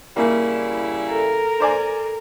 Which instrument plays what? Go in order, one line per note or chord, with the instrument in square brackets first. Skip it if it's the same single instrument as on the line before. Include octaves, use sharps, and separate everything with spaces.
[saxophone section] C#3 G3 E4 [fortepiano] A#3
[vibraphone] A4 [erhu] A#4
[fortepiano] C5 D5 G#5